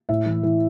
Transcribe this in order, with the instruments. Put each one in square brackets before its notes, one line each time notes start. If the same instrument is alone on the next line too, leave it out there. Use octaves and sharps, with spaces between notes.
[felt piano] A2 E5
E3
E3